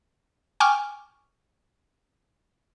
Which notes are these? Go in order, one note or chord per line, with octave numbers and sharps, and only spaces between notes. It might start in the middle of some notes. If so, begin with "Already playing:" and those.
G5 G#5 C#6 D6 F6